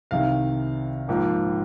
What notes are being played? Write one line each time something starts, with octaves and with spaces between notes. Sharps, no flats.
C2 C3 D#3 F5
A#1 G#2 F3 A#3